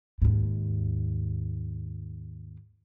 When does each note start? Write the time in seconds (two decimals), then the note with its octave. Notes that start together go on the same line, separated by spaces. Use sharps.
0.22 D#2 G#2